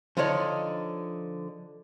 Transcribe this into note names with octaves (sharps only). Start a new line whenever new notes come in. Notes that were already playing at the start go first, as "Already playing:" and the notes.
D3 F3 D4 D#4 C#5 D5